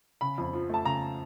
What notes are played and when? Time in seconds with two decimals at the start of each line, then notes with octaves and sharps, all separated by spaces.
0.21 C#3 B5
0.38 F2
0.53 F3
0.70 A3 A5
0.85 C#3 A#5